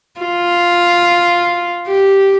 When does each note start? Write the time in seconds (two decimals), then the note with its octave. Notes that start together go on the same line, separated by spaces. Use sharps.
0.21 F4
1.87 G4